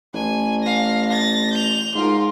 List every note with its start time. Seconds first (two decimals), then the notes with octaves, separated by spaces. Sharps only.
0.14 A1 G#5
0.63 F5 A#6
1.08 A6 A#6
1.53 G6 F7
1.95 G#2 F4 A#4